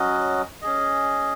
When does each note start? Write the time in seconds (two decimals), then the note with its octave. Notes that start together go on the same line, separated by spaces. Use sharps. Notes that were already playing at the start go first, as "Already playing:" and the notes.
Already playing: F#3 C#4 F#4 D#5
0.62 C#4 G#4 D#5